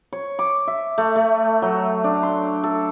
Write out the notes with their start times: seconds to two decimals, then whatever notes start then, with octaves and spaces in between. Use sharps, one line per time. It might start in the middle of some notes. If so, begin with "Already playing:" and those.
0.13 C#5
0.39 D6
0.67 E5
0.98 A3
1.16 A3
1.62 F#3
2.04 D4
2.23 C6
2.64 A4